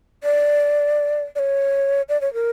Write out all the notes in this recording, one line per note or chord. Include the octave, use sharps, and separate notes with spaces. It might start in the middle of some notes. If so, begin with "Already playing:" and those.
D5
D5
C#5
D5
C#5
A#4